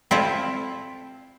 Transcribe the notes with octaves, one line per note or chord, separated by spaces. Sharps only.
C4 E4 F4 A4